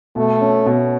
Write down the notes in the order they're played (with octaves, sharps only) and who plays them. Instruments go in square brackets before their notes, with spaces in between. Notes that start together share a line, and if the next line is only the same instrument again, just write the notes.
[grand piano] B2 [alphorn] A3
[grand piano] C#4
B2